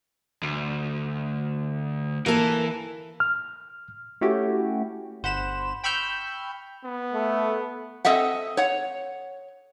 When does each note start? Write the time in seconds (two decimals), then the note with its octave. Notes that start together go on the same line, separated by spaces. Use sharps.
0.43 D2
2.26 E3 A#3 A4
3.20 F6
4.21 A3 C#4 E4 F#4 G4
5.23 G1 C5 F#5 B5 E7
5.84 G5 B5 C#6 E6 F6 G6
6.84 B3
7.13 A3
8.05 C4 A4 D#5 E5 F#5
8.57 C#5 F#5